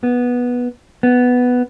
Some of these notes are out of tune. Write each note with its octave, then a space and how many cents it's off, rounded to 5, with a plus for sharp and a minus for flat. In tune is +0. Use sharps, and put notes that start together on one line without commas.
B3 -10
B3 +5